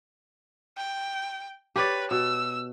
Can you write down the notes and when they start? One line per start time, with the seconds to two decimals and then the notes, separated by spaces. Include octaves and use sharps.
0.77 G5
1.76 G4 B4 C#5 D5
2.11 B2 E6